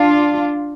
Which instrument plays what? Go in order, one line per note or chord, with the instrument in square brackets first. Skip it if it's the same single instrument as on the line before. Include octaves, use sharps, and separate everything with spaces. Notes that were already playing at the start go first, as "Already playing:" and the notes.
Already playing: [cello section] D4 F4